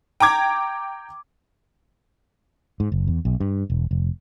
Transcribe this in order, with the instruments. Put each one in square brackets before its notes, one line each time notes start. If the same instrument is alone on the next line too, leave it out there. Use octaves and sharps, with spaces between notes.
[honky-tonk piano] G5 A#5 D6 G#6
[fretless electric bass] G#2
F#1
E2
B1
G2
E1
F1